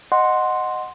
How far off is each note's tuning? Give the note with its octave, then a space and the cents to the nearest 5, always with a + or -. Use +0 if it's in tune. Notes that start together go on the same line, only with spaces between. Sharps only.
D#5 -10 F#5 -5 C6 +0